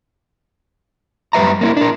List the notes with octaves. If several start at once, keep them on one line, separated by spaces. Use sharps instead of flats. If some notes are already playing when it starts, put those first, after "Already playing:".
F#2 G3 B4 E5 A#5
A#3 C#4 E4
D4 A#4